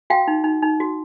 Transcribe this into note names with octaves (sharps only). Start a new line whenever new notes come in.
F#4 F5 G5
D#4
D#4
D#4
F#4